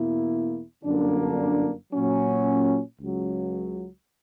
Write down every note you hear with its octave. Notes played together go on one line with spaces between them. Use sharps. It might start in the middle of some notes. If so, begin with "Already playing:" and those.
Already playing: E2 B2 A#3 E4
G1 F#2 D3 A#3 D4
A#2 F#3 C#4
C#2 C#3 F#3